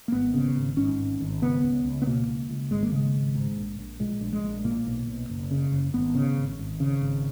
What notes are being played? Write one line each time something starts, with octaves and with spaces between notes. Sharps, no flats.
A#3
G#1 B3
C#3
G#1
G#2 C#4
G#1
G#1
C#3 B3
C#2
C#2
B3
B2 A#3
C#2
C#2
G#1 G#3
A#3
C#3 G#3
G#1
G#2
A#1
A#1
A#2 G#3
A#1
G#3
A#1
A#2 A#3
B1
B1
F#1
C#3
F#1
G#1 B3
C#3
G#1
G#1
C#3
G#1